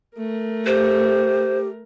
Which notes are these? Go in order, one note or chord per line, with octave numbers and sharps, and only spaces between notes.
A3 A#4
G4 C5